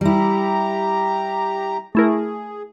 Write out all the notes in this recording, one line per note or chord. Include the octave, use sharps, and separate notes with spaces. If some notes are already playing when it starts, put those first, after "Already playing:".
G3 E4 G4 A#5
A3 E4 G#4 A#4